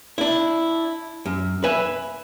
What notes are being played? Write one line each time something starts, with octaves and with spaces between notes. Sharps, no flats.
D4 E4
F#2
B4 E5 G#5